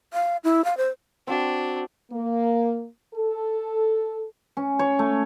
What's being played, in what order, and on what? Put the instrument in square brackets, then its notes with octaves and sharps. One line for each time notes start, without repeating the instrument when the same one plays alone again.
[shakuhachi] F5
E4
F5
C5
[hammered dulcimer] C4 F#4 [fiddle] D4
[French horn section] A#3
A4
[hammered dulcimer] C#4
C#5
A3